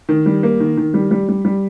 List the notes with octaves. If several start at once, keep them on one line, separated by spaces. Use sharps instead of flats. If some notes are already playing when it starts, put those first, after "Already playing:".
D#3
G3
A#3
D#3
D#3
G3
G3
G3
G3